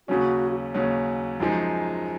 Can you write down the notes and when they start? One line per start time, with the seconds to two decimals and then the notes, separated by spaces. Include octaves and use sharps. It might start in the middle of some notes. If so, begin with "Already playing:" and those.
0.08 D#2 C#3 F#3 C#4 F#4
0.74 D#2 C#3 F#3 C#4
1.40 F#2 F3 G#3 D#4